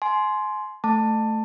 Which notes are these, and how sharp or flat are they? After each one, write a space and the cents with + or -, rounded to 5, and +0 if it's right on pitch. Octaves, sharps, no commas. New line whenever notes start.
G#5 +35 C6 +0
A3 +0 A5 +15